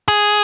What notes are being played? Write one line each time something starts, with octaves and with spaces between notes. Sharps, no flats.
G#4